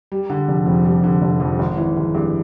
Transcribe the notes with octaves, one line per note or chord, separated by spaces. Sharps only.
G3
D3
F1
F2
G3
D3
F1
F2
G#1
E3
G#1
G2